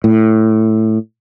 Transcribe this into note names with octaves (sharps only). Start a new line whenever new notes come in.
A2